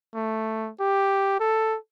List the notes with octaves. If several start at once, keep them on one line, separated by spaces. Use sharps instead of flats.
A3
G4
A4